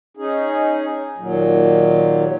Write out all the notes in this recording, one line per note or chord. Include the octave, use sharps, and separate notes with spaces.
C#4 D#4 G#4
D#2 A#2 F#3